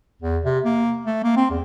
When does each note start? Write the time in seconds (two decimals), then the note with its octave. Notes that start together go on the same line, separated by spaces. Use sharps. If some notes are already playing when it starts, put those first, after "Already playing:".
0.22 E2
0.45 C3
0.65 A#3
1.06 A3
1.24 A#3
1.37 C4
1.51 E2